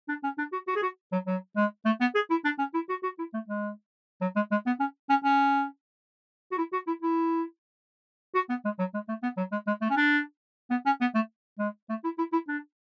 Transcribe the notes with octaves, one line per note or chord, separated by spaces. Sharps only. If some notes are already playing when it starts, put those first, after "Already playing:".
D4
C#4
D4
F#4
F#4
G#4
F#4
F#3
F#3
G#3
A3
B3
G#4
E4
D4
C#4
E4
F#4
F#4
E4
A3
G#3
F#3
G#3
G#3
B3
C#4
C#4
C#4
F#4
E4
F#4
E4
E4
F#4
B3
G#3
F#3
G#3
A3
B3
F#3
G#3
G#3
A3
C#4
D4
B3
C#4
B3
A3
G#3
A3
E4
E4
E4
D4